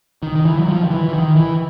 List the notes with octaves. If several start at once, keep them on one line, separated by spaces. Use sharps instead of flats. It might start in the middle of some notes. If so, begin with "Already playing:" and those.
D#3
D#3
E3
F#3
F3
D#3
E3
E3
D#3
E3